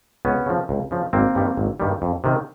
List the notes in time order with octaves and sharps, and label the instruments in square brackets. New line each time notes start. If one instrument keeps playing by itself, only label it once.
[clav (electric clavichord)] C#2 B3 C#4
C#3 F3
C#2
C#3 F3
G#1 A#3 C4
G2 D#3 G3
G#1
G2 D#3 G3
F2
C3 D#3